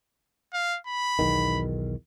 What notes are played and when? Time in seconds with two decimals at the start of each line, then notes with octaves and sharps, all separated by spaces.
0.53 F5
0.87 B5
1.19 B1 E2 D#3